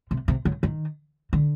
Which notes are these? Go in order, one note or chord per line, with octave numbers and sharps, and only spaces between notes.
C3
C3
C#3
D#3
D3